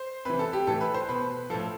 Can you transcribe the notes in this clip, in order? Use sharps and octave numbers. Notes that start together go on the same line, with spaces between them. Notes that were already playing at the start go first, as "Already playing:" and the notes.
Already playing: C5
C3 E3 B4
A4
G4
A2 E3 A4
B4
C5
B2 B4
A2 F3 A4